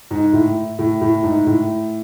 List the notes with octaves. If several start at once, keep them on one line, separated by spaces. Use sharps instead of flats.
G#2
A2
A2
A2
G#2
A2